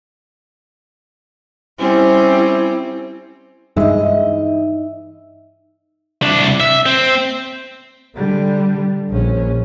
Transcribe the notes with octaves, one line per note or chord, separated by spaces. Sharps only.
G3 C4 C#4 E4
G2 E3 G#3 D#4 D#5 E5
C2 D4
E5
C4
D3 G3
A#1 C#4